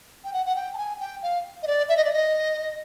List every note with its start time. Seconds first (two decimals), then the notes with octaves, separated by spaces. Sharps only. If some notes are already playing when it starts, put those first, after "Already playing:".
0.24 G5
0.33 F#5
0.46 F#5
0.56 G5
0.74 A5
0.78 G#5
1.00 G5
1.23 F5
1.63 D#5
1.67 D5
1.89 E5
1.97 D#5
2.05 D5
2.13 D#5